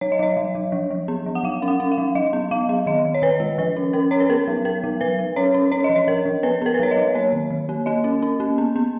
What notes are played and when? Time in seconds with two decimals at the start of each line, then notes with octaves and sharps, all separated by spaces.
0.01 F#3 C#5
0.12 D#5
0.19 F#3 C#5
0.37 F#3
0.55 F#3
0.72 F3
0.91 F3
1.08 B3
1.26 F3
1.35 F#5
1.44 F#3 F5
1.62 C#4
1.68 F#5
1.80 C#4
1.92 F5
1.98 F#3
2.15 F#3 D#5
2.33 B3
2.51 F#3 F5
2.69 B3
2.86 D#3 D#5
3.05 D#3
3.14 C#5
3.22 D#3 B4
3.40 G#3
3.58 F3 B4
3.77 C#4
3.93 C#4 A#4
4.11 C#4 C#5
4.20 B4
4.30 B3 A#4
4.47 F#3
4.65 B3 A#4
4.84 F#3
5.01 F#3 B4
5.19 F#3
5.36 C#4 C#5
5.54 C#4
5.72 C#4 C#5
5.84 D#5
5.90 F3
5.96 C#5
6.07 F3 A#4
6.26 F3
6.43 B3 B4
6.62 B3 A#4
6.74 B4
6.79 F#3 C#5
6.91 D#5
6.97 F#3
7.15 A#3 C#5
7.33 D#3
7.50 D#3
7.69 A#3
7.86 A#3 D#5
8.04 C#4
8.22 C#4
8.40 A#3
8.58 B3
8.76 B3